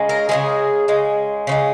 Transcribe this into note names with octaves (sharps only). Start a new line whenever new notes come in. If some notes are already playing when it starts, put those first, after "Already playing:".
Already playing: C#3 G#3
A#4
C#3 F3 G#3 G#4
C#3 G#3
C#3 F3 G#3